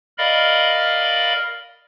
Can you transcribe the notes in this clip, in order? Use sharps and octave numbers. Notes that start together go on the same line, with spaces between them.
A#4 D5 D#5 F5 B5